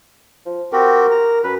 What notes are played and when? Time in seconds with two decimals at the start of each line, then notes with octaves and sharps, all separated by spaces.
0.46 F3
0.73 C4 F#4 G4 A#4
1.11 A#5
1.44 F#2 B4